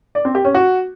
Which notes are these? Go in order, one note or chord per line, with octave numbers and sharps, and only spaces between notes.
D5
C4
G4
C#4
F#4